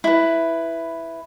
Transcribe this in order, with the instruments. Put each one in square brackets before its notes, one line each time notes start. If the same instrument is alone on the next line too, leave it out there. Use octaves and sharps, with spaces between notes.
[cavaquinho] E4 B4